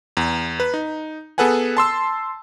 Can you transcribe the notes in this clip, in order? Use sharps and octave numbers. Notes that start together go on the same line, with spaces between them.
E2
B4
D#4
B3 G#4 A4 B4 F#5 G#5
A5 C6 E6